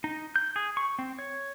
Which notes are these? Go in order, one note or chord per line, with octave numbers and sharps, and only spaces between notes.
D#4
G6
G#4
C#6
C4
C#5